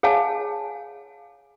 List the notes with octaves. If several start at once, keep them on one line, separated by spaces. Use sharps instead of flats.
G#4 C#5 F5 G#5 A5